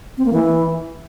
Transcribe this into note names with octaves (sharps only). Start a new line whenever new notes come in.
C4
A#3
E3